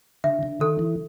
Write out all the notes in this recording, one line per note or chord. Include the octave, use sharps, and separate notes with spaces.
D3 E5
D3
D#3 A4
E3